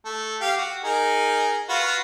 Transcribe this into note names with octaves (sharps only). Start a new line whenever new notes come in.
A3
G4 F5
F#4
D#4 G#4 A#4
F4 F#4 B4